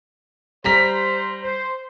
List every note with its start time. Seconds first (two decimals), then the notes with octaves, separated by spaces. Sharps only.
0.64 G3 C5 A#5 B6
1.42 C5